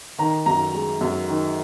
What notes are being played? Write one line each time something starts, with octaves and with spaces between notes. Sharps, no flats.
D#3 A#5
F#2 A#5
G#3
F#2
D#3